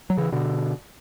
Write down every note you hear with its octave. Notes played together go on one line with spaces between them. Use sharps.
F#3
C#3 E3
B2 D3